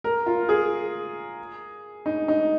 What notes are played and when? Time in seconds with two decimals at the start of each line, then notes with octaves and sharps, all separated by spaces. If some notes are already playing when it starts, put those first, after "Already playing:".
0.04 A#4
0.26 F4
0.49 G#4
2.06 D#4
2.28 D#4